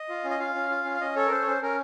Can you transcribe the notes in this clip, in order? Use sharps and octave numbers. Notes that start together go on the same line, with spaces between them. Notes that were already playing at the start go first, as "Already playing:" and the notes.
Already playing: D#5
F4
C#4
D#5
F4 F5
C#4
F4
C#4
F5
C#4 D#5
A4 C#5
A#4
C#4 C5
C#5
C#4 C5
C#4 A#4